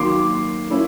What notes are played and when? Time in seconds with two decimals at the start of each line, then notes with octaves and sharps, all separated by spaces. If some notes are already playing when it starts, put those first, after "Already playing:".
Already playing: D#3 F#3 A#3 C6 D6
0.70 A#3 C#4 E4